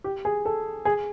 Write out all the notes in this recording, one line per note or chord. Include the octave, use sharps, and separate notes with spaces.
G4
G#4
A4
G#4